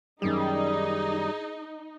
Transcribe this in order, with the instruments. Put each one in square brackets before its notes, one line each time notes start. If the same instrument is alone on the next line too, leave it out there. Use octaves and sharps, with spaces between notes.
[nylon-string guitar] F#2 D#3 C#4 [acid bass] G3 [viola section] D#4 [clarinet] G#4